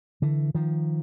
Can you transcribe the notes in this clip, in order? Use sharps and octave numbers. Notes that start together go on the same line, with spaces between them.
D3 E3
D#3 F3